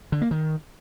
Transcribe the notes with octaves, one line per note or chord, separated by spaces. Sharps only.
D3
A#3
D#3